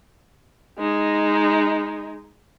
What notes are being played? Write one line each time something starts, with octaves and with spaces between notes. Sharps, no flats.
G#3 D#4